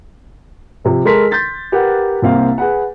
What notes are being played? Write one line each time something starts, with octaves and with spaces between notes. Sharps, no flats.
C3 F3
G#3 A4 A#4 A#5 C6 B6
C6 G6 A6 B6
G4 A#4 B4 F#5
C2 A#3 C4 F5
G#4 B4 F#5